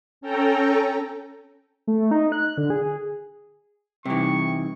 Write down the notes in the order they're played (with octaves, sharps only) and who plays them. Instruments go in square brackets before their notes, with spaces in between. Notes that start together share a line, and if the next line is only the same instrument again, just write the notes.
[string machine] C#4 A4 G5 A#5
[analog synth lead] A3
D#4
F#6
D3
G#4
[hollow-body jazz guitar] C3 E3 [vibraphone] G3 D#4 [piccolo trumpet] C#6